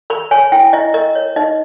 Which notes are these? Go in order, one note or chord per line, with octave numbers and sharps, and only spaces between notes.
A#4 B5
C#5 G#5
E4 G5
E4 D#5
A#4 D#5
C#5
D#4 D#5